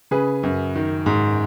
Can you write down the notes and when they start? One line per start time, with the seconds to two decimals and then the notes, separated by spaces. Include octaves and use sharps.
0.11 C#3 G#4 B4
0.43 F#2
0.75 D#3
1.06 G#2